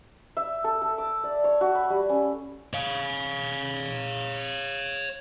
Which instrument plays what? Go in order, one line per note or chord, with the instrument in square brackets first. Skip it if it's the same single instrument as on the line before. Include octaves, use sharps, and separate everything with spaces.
[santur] E5
A4
A4
D6
D5
C#5
F#4
B5
G3
C#4
[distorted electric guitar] C#5 F5